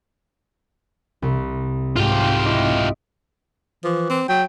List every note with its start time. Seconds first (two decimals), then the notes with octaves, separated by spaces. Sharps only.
1.22 C2
1.96 G#2 F4 G4
2.45 E4 D#5 D6
3.84 E3 F3
4.10 C4
4.28 F#3 G5